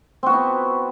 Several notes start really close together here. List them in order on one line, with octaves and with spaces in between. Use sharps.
C4 F#4 B3 E4